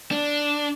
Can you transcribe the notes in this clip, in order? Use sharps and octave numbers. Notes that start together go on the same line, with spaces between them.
D4